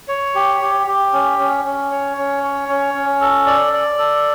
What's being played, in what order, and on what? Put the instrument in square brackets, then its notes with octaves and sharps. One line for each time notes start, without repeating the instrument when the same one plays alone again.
[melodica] C#5
G4
G4
G4
C#4
C#4
C#4
C#5
C#4
C#5
C#4
C#4
A4
D5
D5
A4